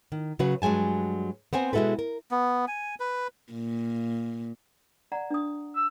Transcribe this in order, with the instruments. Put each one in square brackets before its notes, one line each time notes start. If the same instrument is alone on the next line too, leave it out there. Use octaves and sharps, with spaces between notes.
[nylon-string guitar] D#3
C#3 F#3 F#4 B4
G2 F#3 G#3 G#5 A5
B3 C4 C5 G#5
B2 G#3 E4 F#4 A4 B4
A#4
[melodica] B3
G#5
B4
[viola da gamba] A#2
[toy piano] D5 F#5 A#5
D4 D#6
[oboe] E6